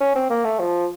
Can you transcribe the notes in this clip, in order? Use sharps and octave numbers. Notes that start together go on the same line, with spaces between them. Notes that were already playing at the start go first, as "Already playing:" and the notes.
C#4
C4
A#3
A3
F3